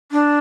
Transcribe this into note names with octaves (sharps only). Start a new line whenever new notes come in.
D4